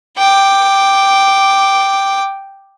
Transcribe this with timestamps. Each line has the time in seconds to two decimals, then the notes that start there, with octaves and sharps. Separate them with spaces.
0.18 G5 D6